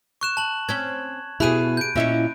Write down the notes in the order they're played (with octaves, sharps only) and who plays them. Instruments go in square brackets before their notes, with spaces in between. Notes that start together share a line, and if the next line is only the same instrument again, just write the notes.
[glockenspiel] C#6 F#6 E7
A5 F#7
[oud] C4 C#4 [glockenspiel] G#6
[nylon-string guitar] B2 E4 [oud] G4 G#4 [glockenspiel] B5 F#6 D#7
[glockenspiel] G6 D7
[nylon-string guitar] A#2 D#5 E5 [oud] C#4 E4 C#5